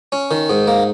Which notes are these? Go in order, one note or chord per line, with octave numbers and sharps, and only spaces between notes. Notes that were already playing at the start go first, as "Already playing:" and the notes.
C#4
D#3
G#2
A#3